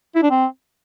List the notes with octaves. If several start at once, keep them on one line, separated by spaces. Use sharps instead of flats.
E4
D4
C4